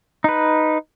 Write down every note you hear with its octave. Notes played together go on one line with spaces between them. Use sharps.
D#4 B4